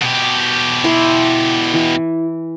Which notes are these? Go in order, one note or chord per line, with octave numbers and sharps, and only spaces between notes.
B2 G4
E4 C6
E3